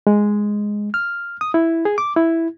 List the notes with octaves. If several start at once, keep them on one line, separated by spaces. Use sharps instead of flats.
G#3
F6
D#6
E4
G#4
D6
E4